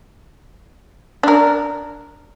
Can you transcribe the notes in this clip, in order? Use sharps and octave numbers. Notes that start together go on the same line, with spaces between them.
D4 A#4